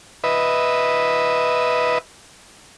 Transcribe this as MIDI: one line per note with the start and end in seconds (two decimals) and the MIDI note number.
0.24 1.98 71
0.24 1.98 75
0.24 1.98 76